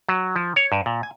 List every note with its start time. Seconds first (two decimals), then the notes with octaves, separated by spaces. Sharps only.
0.09 F#3
0.36 F3
0.56 C#5
0.72 G2
0.86 A#2
1.03 G#5